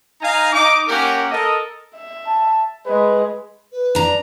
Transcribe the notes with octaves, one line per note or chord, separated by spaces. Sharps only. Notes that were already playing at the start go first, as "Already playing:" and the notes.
D#4 F5 G#5 A#5
D#4 D6
A#3 C#4 G4 A#4 F#5
A4 A#4 D#5
E5
A5
G#3 B4
B4
D4 A#5